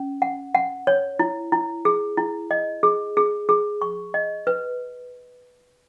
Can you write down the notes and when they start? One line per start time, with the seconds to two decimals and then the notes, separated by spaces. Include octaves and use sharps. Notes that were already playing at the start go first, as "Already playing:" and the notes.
Already playing: C#4
0.22 F#5
0.54 F#5
0.87 C#5
1.19 E4
1.52 E4
1.85 G#4
2.17 E4
2.51 D#5
2.83 G#4
3.17 G#4
3.49 G#4
3.82 C#6
4.14 D#5
4.47 B4